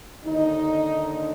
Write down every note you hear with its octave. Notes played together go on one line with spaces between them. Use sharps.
D#2 D3 D#4